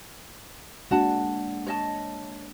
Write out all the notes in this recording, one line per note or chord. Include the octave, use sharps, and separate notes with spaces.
G#3 A#3 D4 F#4 F#5 A5
C#5 D#5 A5